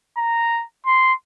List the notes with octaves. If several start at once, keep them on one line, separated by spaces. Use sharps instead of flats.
A#5
C6